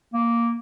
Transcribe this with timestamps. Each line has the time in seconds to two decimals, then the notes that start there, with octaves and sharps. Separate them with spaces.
0.13 A#3